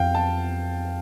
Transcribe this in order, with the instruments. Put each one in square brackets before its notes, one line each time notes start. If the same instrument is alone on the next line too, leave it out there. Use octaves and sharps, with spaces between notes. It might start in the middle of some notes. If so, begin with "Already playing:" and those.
Already playing: [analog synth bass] F2 [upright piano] F5 G5
[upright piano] A5